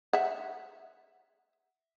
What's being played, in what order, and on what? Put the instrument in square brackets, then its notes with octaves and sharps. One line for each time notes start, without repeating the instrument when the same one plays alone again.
[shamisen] E5 F#5